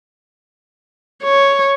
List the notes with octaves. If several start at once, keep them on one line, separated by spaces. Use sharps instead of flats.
C#5